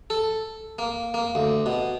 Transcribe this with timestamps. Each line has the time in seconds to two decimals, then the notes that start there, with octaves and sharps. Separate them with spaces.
0.10 A4
0.79 A#3
1.14 A#3
1.35 D2
1.66 B2